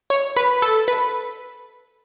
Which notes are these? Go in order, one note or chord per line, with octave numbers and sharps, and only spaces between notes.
C#5
B4
A4
B4